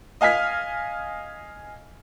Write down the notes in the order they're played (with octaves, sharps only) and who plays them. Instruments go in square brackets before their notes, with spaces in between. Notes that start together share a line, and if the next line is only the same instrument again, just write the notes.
[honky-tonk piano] D#5 F5 G#5 F6 B6